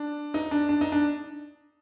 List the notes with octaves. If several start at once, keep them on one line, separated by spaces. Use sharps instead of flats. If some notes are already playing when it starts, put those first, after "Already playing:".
Already playing: D4
D#4
D4
D4
D#4
D4